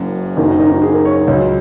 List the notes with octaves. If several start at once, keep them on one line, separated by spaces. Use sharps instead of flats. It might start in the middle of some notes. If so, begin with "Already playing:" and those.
Already playing: F#1 F#2 C#3
F#1 F#2 D#3 D#4
D#4
D#4
D#4
G#4
A#4
C#5
C#5
C#2 C#3 F#3